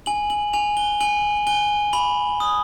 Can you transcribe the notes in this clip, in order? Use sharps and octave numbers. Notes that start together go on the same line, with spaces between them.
G#5 F#7
F#7
G#5 F7
G7
G#5 F#7
G#5 G7
B5 F#7
D#6